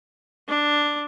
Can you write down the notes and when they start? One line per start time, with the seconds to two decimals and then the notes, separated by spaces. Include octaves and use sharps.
0.48 D4